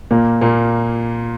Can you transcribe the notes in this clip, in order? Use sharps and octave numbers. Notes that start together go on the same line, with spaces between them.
A#2 A#3
A#2 A#3